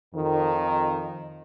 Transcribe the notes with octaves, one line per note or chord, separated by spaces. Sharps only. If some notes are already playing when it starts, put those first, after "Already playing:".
F2 D#3